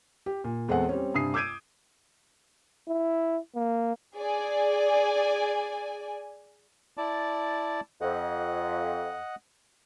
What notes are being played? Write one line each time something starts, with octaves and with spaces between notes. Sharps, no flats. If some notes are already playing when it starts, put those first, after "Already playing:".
G4
A#2
E2 G#3 C4 A4 F#5
G3 C4 C#4
G2 C3 G#5 D#6 C7
D6 E6 G6 G#6 D7 D#7
E4
A#3
G#4 D5 G#5
E4 D5 A5
F2 D#5 F#5